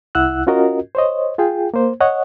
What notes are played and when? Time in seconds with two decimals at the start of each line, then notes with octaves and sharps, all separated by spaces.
0.15 C2 E4 F#5 E6 F#6
0.47 C#4 F4 F#4 A#4 D#5
0.95 C5 C#5 D#5
1.38 F4 G#4 G5
1.74 A#3 C5
2.00 C#5 D#5 F#5